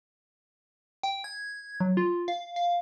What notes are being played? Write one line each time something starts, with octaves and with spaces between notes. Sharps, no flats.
G5
G#6
F#3
F4
F5
F5